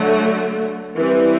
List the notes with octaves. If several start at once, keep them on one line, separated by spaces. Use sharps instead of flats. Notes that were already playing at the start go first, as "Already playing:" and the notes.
Already playing: D3 F#3 A3
E3 G3 C4